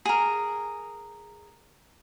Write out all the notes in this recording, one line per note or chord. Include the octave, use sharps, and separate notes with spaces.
G#4 A#4